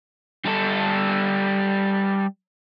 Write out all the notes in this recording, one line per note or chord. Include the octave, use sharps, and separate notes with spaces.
G3 A4